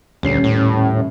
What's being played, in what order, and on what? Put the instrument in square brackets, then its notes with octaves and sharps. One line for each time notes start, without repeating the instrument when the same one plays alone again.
[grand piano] D#1 C#4 C7 [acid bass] D2
[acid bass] A2